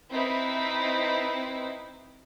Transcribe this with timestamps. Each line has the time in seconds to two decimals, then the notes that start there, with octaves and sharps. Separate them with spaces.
0.11 C4 D#4 E4 B4